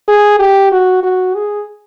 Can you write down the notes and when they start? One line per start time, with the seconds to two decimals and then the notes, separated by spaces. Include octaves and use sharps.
0.08 G#4
0.40 G4
0.72 F#4
1.03 F#4
1.35 G#4